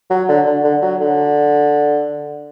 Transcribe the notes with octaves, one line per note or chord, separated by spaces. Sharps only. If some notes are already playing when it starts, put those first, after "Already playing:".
F#3
D3
D3
D3
F#3
D3